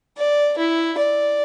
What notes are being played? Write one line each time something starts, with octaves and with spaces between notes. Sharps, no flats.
D5
E4
D5